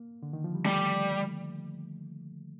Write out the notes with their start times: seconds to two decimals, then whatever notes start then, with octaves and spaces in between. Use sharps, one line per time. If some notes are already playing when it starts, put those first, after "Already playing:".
Already playing: A#3
0.23 D3
0.33 D#3
0.44 F3
0.55 G3
0.66 G3 A3